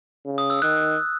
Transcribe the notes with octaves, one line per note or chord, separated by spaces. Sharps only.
C#3
D#6
E6
D#3 F#6